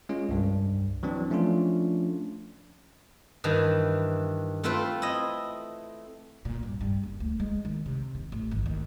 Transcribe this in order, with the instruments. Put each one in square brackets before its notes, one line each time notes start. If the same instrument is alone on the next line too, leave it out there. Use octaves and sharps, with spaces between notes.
[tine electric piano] G#3 C#4 F4
C2 G2 G3
E3 F#3 C4 D4
F3 A3 C#4 D4 F4
[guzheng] G2 D#3 E3
A3 C4 F4 A4 B4 C5
E4 D#5
[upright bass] A#2
G2
G2
F#1
D2
G#3
D#3
C3
D#3
A1
G#1
D#2